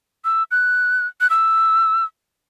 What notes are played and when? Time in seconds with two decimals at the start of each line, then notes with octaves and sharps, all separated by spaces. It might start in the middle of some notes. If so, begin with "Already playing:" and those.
0.25 E6
0.51 F#6
1.21 F#6
1.30 E6